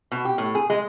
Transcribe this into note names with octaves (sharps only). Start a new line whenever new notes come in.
B2
G4
A2
G#4
G#3